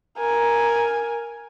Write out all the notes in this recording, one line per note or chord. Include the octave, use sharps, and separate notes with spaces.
A#4 G#5